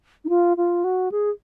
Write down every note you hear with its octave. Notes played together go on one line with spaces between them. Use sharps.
D#4
F4
F4
F#4
G#4